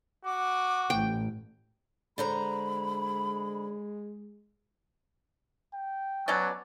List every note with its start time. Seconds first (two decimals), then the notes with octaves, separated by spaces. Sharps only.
0.25 F#4 D6
0.90 A1 G5
2.18 D3 G#3 C5 A#5 B5
5.74 G5
6.28 B2 F#3 C#4 D5